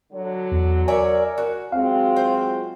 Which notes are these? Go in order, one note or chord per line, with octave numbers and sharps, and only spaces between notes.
D3 F#3
E2
A#4 C#5 D5 E5 G#5
F#4
F#3 G#3 C4 F4 F5
C5